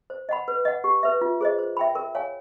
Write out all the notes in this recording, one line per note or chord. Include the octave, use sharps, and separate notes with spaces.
C5
D#5 F#5 B5
B4
D#5 F#5
G4
B4 E5
F4
G#4 C5 D#5
C5
E5 G5 B5
A#4
C#5 F5 G#5